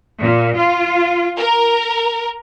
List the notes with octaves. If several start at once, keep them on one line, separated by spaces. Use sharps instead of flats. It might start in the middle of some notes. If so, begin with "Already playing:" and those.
A#2
F4
A#4